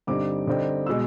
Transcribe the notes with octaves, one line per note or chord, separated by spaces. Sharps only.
G2 D3 G3 C4 D#4 D6
D3 G3 C4 D#4
B2 G#3 E6